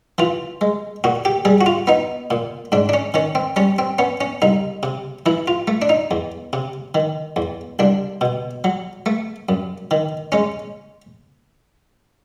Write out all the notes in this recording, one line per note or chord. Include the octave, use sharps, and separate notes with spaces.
E3 F4
G#3
A#2 F#4
G4
G3 G#4
F#4
F4
B3 D#4
A#2
G#2 D4
D4
C#4
D#3 C#4
C4
G3 C#4
C4
B3 C#4
C#4
C2 D#4
C3
E3 E4
F4
A3
D4
D#4
E2
C3
D#3
E2
C2 D4
B2
F#3
A3
F#2
D#3
G#3 C#4